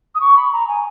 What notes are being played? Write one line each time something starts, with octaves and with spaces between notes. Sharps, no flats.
D#6
C#6
B5
A#5
G#5